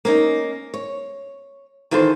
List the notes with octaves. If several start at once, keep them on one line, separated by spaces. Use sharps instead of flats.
A#3 C#4 D#4
C#5
D#3 E3 F4 A4 C5